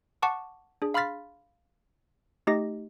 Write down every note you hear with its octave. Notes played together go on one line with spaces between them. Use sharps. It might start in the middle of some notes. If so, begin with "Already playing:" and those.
F#5 A5 C#6 D6
D4 G#4
F5 B5 C6 F6 A6 B6
A3 D#4 G4 D#5 A#6